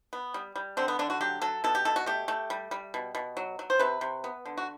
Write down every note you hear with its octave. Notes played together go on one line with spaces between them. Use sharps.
B3
G3
G3
D3 C4
B3
D3 D4
F#4
F#3 G4
F#3 A4
B2 A4
G4
B2 A4
F#4
A3 G4
A3
G3
G3
B2
B2
F#3
F#3
C5
C3 B4
C3
B3
D3
F#4